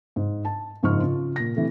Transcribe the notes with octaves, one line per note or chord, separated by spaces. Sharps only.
G#2
A5
F#1 G#2 F3 C#6 F6
C#3 F4
A#2 A#6
C3 E3 A3